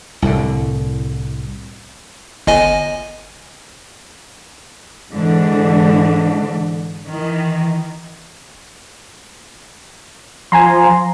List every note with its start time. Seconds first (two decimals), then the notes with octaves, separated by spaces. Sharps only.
0.22 C2 A2 D3
2.47 G1 D#5 G#5
5.11 G#2 D3 E3 G#3 D4
7.08 D#3 E3
10.52 F3 G#5 A#5 C6